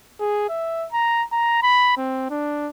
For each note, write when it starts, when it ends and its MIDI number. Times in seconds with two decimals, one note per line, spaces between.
0.20 0.47 68
0.49 0.86 76
0.92 1.23 82
1.32 1.61 82
1.63 1.94 83
1.98 2.27 60
2.30 2.69 62